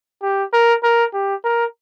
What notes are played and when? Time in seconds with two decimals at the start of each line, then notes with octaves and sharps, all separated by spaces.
0.23 G4
0.53 A#4
0.84 A#4
1.14 G4
1.44 A#4